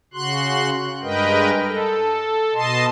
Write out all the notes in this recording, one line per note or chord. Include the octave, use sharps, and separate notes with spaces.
C#3 F#4 C6 F#6
G2 G#3 A#4 B4 D#5 G5
A4
B2 D#5 A5 C6